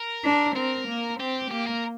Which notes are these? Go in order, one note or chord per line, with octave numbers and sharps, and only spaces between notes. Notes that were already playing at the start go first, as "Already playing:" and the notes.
Already playing: A#4
D4
C4 A#4
A#3
C4 G4
A#3 G4
A#4